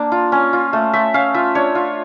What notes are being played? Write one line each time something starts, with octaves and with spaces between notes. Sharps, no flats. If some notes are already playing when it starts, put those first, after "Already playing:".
Already playing: A#3 D4
F4
C#4
F4
A3
A3 E5
C#4 F5
F4 E5
D4 C#5
F4